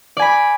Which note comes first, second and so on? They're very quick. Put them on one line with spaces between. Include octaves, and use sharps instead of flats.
D5 G#5 B5